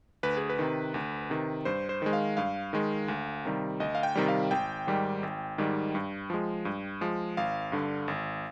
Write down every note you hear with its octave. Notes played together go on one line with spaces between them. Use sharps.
D2 B4
G#4
B4
C3 D#3
D2
C3 D#3
G2 C5
C5
D#3 G#3
F5
G2 F5
D#3 G#3
D2
C3 D#3 G3
D2 D#5
F5
G5
C3 D#3 G3
F5
G#1 G5
G#2 D#3 G3
G#1
G#2 D#3 G3
G2
F3 G#3
G2
F3 G#3
G#1 F5
G2 D3
G#1